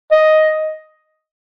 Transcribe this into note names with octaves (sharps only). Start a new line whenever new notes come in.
D#5